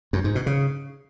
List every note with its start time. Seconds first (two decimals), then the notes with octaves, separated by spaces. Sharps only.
0.13 F#2
0.24 G#2
0.35 B2
0.46 C#3